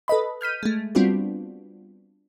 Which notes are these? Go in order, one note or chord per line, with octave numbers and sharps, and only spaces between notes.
A4 B4 D#5 B5
F6 G6 B6 D#7
G#3 A3
G3 B3 C4 D4 F4 F#4